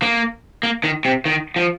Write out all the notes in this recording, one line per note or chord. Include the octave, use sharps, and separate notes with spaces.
A#3
A#3
D#3
C3
D#3
F3